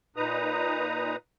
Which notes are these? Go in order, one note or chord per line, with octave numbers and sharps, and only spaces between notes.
A#2 D#4 B4 A#5 D#6